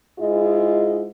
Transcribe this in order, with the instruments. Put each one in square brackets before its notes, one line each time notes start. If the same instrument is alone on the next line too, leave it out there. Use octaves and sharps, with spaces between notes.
[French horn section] G#2 E4 F4 G#4 D#5